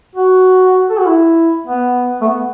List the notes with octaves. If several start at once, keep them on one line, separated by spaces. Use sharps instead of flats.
F#4
A4
F#4
E4
B3
A3
B3